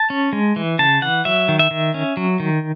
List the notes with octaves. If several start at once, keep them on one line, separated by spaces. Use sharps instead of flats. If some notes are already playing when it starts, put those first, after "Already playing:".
Already playing: A5
C#4
G#3
E3
C#3 A5
E3 F#5
F#3 E5
D#3
E5
D#3
C#4
F#3
D#3